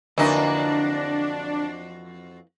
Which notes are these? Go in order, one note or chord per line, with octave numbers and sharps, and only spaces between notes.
F2 D3 E3 A#3 D4 D#4 F#4 D#5